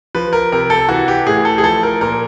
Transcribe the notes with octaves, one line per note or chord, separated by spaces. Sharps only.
F3 B4
A#4
C3 A#4
A4
E3 F#4
G4
A2 G#4
A4
G#4
F3 A4
A#4
A#2 A#4